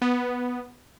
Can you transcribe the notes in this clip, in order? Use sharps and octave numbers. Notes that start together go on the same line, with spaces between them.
B3